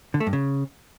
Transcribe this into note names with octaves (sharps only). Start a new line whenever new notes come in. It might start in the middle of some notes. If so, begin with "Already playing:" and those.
D3
A3
G2
C#3